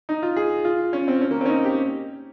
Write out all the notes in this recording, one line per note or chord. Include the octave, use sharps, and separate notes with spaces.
D#4
F4
G#4
F4
C#4
C4
C#4
A#3
C4 C#4
D#4
G4